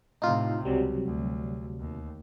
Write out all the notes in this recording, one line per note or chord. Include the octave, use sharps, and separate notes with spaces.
A2 C3 D#4 F4
C#2 C3 F#3 G3
D2
D#2